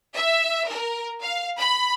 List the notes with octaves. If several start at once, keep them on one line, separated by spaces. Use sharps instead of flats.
E5
A#4
F5
B5